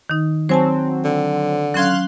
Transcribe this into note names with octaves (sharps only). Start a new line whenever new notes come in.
D#3 D#4
F#3 C4 C5 G#5 A5
D3
F#3 C#4 F5 C6 F#6 G#6